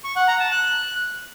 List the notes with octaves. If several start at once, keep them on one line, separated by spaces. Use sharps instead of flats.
C#6
F#5
A#5
A5
F#6